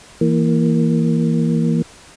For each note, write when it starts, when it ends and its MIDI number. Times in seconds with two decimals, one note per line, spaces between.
0.21 1.82 52
0.21 1.82 58